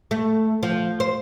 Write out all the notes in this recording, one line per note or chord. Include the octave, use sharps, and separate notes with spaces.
A3
F3
C5